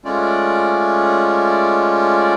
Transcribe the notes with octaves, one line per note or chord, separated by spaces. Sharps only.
G#3 A3 C#4 F4 D5